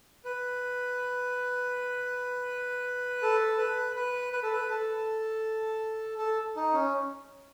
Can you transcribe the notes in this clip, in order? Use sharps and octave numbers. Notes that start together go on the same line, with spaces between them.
B4
A4
B4
B4
B4
A4
B4
A4
A4
D#4
C#4